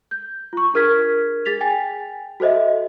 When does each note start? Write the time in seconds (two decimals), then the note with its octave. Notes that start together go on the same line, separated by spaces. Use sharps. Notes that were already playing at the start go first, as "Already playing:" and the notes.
0.11 G6
0.53 F4 C#6
0.74 D4 G#4 A#4 F6 G#6 B6
1.45 G#4 A6 B6 F7
1.61 G5 G#5 A6
2.40 F#4 A4 C5 D#5 E5